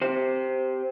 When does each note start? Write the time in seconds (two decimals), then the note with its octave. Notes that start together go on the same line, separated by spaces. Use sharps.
0.02 G4 C5